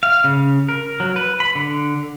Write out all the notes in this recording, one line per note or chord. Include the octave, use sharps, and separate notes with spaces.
F5
C#3
A#4
F#3
B4
B5
D3